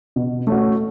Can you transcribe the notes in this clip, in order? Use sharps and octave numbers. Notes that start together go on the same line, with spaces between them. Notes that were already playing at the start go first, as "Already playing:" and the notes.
B2
A3 C#4 F#4